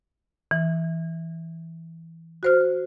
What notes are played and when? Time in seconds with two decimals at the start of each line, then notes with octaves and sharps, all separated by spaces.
0.51 E3
2.43 F#4 C5 F6